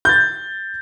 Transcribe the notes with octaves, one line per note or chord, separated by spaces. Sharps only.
G6 A6